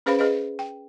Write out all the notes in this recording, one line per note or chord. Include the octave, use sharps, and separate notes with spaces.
C#4 G#4 B4 C5 F5 B5
G#4 B4 D#5 F5
G5